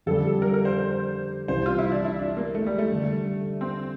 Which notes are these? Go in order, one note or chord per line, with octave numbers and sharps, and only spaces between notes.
F2 D3 G3 A4
A#4
A#4
C5
C2 C3 E3 C5
F4
E4
D4
E4
D4
A#3
A3
G3
A3
D3 G3 D4
C4